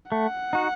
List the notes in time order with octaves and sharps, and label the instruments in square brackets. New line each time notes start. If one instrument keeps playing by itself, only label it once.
[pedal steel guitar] A3 [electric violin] F#5
[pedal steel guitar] D#4 F#4